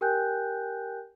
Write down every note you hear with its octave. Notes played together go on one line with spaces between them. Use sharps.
G4 A#4 G5 G#5 F#6 G6